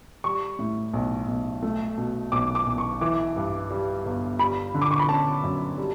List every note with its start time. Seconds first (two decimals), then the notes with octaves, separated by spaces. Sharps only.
0.24 G3 C#6
0.59 A2
0.93 B1
1.28 B1
1.62 A3
1.98 B2
2.32 B1 D6
2.55 D6
2.67 B1
2.78 C#6
3.01 E3 D6
3.36 G2
3.71 G3
4.05 G1
4.39 G3 B5
4.74 D3
4.82 D6
4.91 C#6
4.99 B5
5.09 C#4 A5
5.43 F#2
5.78 G3